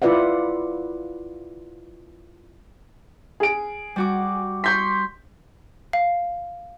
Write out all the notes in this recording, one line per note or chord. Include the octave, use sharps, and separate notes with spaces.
E4 F4 B4 D5 E5 F#5
G#4 D7
G3 F#4 D6
C6 C#6 G6 B6
F5